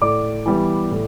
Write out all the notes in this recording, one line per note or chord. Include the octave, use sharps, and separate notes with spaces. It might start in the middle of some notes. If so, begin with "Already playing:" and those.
A2 D5 D6
E3 G3 B3
A2